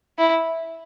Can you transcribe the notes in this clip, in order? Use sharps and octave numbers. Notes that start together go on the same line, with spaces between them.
E4